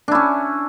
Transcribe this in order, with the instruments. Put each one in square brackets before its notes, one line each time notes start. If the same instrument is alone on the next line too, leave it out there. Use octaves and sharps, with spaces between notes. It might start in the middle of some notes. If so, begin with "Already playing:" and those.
[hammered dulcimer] D4
E4
C#4